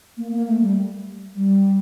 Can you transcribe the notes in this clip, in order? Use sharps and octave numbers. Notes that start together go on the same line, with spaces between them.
A#3
A#3
A3
G3
G3